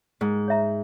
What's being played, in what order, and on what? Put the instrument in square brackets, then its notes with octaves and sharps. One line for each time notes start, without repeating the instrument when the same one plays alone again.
[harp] G#2 [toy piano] A#4
[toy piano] C#5 E5 A#5